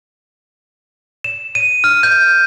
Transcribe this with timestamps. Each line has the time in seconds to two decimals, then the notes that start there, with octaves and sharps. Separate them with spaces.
1.24 E7
1.55 D#7
1.84 F6
2.03 G6